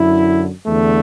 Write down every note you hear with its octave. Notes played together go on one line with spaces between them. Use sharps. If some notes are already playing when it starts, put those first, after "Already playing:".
Already playing: F#2 D3 E4
E2 D3 A3